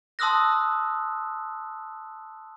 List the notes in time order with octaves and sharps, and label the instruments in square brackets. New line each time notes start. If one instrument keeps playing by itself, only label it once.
[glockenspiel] A5 C6 D#6 E6 F#6 A#6